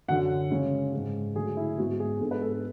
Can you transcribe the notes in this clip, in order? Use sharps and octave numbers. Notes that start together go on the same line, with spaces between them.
F#2 D3 F#3 F#5
C#3 G#3 C#4
G#2 G#3 C#4
D3 F#3 A3 G#4
E4
G#2 G#3 B3 F#4
G#4
G#2 G#3 B3 D4 A4
B4
A4
A4